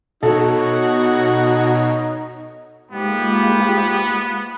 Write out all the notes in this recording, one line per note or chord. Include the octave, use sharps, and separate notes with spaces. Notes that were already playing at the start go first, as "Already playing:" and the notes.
B2 D#4 F#4 A4 C#5
G#2 G#3 A#3 B3 F4 G4